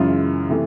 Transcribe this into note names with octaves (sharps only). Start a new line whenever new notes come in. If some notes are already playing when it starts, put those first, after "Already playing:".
Already playing: F#2 C#3 E3 G#3 F4
C3 E3 A3